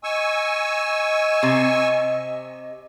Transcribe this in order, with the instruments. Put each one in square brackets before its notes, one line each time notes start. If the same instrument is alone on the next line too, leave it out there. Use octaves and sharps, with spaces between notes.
[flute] D#5 [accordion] G#5 C#6 E6
[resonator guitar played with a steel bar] C3